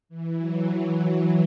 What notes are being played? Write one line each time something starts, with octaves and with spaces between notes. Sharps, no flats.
E3
F#3
F#3